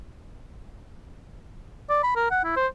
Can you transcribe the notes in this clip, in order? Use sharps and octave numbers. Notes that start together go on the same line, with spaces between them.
D5
B5
A#4
F#5
E4
C5